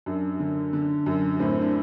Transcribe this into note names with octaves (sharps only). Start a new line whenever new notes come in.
F#2 D4
D3
D3
F#2
A2 C4
D4